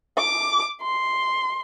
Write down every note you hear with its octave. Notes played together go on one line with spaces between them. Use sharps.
D6
C6